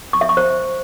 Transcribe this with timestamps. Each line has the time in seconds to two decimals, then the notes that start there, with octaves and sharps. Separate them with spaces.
0.13 C#6
0.21 E5
0.29 C#6
0.37 C5